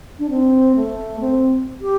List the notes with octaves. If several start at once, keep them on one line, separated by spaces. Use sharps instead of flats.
D4
C4
A3
C4
G4